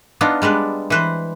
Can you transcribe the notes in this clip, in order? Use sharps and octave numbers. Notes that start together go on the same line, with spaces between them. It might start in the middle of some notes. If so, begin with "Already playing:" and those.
B3 D4 D#4 F4
G3 G#3 D4 B4
E3 B4 C5